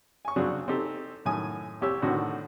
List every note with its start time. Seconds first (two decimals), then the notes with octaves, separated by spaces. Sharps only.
0.25 G#5 C#6
0.36 C#3 F#3 C4 D4 G#4
0.68 C4 D#4 G4 A4
1.25 F#2 A2 D#3 G#5 D#6
1.81 C2 G4 C#5 E6
2.02 A2 D3 D#3 C4 F#4